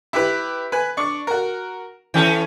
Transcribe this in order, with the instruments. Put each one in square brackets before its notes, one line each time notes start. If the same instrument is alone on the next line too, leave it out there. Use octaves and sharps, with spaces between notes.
[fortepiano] E4 G4 B4
B4 G#5
D4 C#6
F#4 A#4
[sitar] E3 C#4 A4 [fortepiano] G5